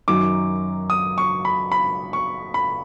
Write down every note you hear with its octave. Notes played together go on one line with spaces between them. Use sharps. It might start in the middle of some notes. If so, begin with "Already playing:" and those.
F#2 D#3 F#3 D6
D#6
C#6
B5
B5
C#6
B5